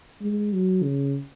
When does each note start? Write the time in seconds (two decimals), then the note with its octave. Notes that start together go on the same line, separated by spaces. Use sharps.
0.21 G#3
0.53 F#3
0.83 C#3